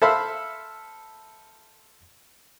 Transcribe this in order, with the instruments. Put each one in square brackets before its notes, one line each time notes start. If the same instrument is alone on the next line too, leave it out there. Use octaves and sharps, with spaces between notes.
[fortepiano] A4 C5 E5 F5 B5